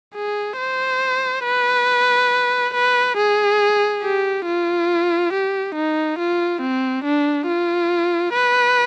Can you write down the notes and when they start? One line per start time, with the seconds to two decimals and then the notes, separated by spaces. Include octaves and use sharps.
0.15 G#4
0.59 C5
1.45 B4
2.74 B4
3.18 G#4
4.03 G4
4.46 F4
5.33 G4
5.75 D#4
6.19 F4
6.62 C4
7.05 D4
7.47 F4
8.34 B4